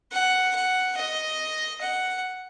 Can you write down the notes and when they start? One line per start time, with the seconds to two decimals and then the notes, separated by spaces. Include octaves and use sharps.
0.12 F#5
0.55 F#5
0.97 D#5
1.82 F#5